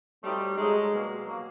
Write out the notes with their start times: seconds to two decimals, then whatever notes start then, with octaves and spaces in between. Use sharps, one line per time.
0.23 F#3 G3 A3 C4 D#4
0.57 F#3 G#3 A3 C4 D#4
0.92 B2 F#3 A#3
1.25 B2 F#3 A#3